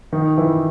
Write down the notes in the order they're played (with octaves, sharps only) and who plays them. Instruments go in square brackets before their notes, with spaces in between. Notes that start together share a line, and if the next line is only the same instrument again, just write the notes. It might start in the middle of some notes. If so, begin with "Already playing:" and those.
[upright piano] D#3 D#4
E3 E4